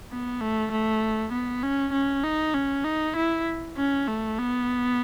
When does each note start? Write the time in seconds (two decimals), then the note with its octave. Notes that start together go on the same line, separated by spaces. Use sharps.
0.11 B3
0.41 A3
0.71 A3
1.32 B3
1.63 C#4
1.93 C#4
2.24 D#4
2.54 C#4
2.84 D#4
3.16 E4
3.77 C#4
4.07 A3
4.38 B3